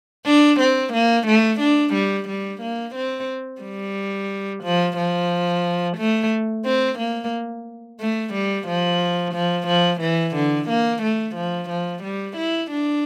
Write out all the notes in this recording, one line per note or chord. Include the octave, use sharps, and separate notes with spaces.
D4
C4
A#3
A3
D4
G3
G3
A#3
C4
G3
F3
F3
A3
C4
A#3
A3
G3
F3
F3
F3
E3
D3
A#3
A3
F3
F3
G3
E4
D4